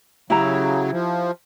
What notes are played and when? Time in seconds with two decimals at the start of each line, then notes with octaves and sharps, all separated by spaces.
0.30 C#3 F#3 E4 G4 A#5
0.92 F3